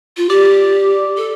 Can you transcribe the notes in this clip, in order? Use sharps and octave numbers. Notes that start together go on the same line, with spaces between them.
F4
G4 D5
A4